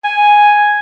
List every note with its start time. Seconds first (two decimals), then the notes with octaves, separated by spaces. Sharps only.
0.04 G#5